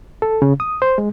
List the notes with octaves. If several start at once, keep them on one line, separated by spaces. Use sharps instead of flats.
A4
C#3
D#6
C5
G#3